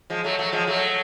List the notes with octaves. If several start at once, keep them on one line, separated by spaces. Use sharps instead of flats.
F3 G#3
F#3 A3
F#3 A3
F3 G#3
F#3 A3